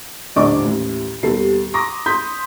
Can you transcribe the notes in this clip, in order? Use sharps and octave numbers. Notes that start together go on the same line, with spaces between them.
D#1 A2 D3 D5 D#5 D6
A1 D#2 A2
D#2 B2 G3 A4 C7
A#5 C6 D6 D#6 A#6
B5 C6 D#6 G6 B6